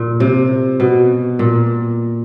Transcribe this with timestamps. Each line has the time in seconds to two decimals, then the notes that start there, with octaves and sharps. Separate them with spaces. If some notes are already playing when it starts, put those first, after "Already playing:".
Already playing: A#2
0.20 C3
0.80 B2
1.39 A#2